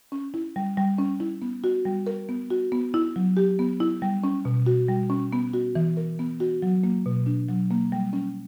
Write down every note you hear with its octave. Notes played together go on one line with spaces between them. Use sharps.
C#4
E4
G3
G3
C#4
E4
B3
F#4
G3
A#4
B3
F#4
B3
E4
F#3
G4
B3
E4
G3
C#4
B2
F#4
G3
C#4
B3
F#4
E3
A#4
B3
F#4
F#3
A#3
B2
D4
F#3
A#3
G3
C#4